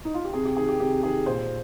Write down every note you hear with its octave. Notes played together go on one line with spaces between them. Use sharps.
D#4
F4
G4
C3 G#4
G4
D#3 G#4
G4
C3 G4
D#3 G#4
A#2 C5